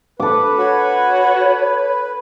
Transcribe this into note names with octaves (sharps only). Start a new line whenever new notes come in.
A4 B4 D6
F#4 C#5